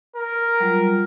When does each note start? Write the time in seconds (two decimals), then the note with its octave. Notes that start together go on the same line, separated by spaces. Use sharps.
0.16 A#4
0.60 F#3 G3 F4